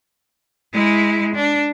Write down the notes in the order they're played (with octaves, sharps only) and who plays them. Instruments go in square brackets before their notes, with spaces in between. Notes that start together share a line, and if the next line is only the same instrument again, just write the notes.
[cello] G#3 E4
D4